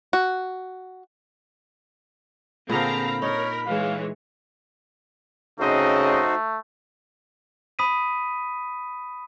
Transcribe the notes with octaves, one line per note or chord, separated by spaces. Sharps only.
F#4
A#2 D3 C4 G#4 F5 A#5 B5
D#4 A#4 C#5
E3 G#3 C#5 F5
C#3 A3 C4 D#4 F#4 C5 D#5
B5 D#6 B6 D#7